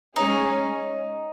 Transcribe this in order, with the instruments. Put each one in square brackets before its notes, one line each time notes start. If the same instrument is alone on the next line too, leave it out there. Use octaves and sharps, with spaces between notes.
[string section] G#3 C#4 G#4 C#5 [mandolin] D#4